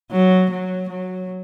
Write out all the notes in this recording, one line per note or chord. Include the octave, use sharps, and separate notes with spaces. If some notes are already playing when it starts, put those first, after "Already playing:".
F#3
F#3
F#3